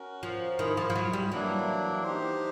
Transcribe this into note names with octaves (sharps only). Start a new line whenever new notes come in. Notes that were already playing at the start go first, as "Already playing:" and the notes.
Already playing: C#4 F#4 A#4
F3
D#3 E4 G#4 C5
F3
F3
F#3
G3
E3 F#3 A#3 D4
D#4 G4 C5